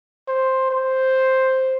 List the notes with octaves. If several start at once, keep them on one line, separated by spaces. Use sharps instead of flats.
C5
C5